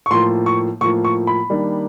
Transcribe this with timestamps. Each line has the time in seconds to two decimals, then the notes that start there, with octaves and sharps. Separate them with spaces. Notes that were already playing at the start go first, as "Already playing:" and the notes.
0.06 C#6
0.11 A2 F3 A#3 C6
0.46 C#6
0.81 A2 F3 A#3 C#6
1.05 C#6
1.27 B5
1.50 D#3 G3 A#3 D4